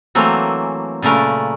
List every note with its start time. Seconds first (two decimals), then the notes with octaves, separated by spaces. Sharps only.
0.15 E3 F#3 A3 A#3 C4
1.02 A#2 C#3 A3 A#4 B4